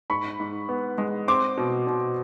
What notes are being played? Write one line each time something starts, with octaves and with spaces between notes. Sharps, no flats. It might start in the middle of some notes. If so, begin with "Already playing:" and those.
G#2 B5 C#6
G#2
B3
G#3
C4 C6 D6
B2
B2